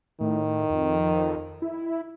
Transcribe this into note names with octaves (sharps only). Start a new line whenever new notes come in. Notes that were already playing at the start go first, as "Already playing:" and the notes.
A2 D#3
F2
E4